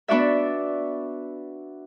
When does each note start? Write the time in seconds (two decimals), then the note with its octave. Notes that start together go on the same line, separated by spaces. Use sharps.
0.08 B3 D4 F#4 D5 E5